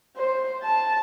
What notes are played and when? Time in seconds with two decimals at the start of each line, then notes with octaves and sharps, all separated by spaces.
0.17 C5
0.63 A5